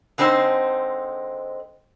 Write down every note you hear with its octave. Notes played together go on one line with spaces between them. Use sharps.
D3 G#3 C4 D#4 C5